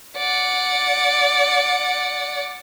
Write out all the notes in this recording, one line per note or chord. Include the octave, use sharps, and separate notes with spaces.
D5 F#5